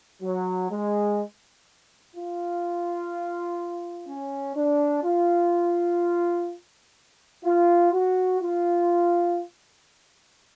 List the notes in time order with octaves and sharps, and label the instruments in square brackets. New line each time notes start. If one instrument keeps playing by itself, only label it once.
[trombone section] F#3
G#3
F4
C#4
D4
F4
F4
F#4
F4